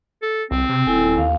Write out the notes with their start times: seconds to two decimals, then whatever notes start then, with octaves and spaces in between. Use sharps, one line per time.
0.22 A4
0.51 C2 C4
0.69 C3
0.87 D#1 E4 A4 G#5
1.18 D#2 F5